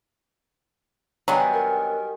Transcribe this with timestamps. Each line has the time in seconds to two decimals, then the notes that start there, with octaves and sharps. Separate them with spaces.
1.28 D#3 F#3 G3 B3 D4 G#5
1.53 A#4